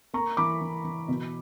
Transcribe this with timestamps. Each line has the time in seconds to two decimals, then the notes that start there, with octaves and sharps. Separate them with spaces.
0.14 A#3 A#5 C#6
0.37 E3 B5 D6
0.61 E3
0.85 E3
1.08 B2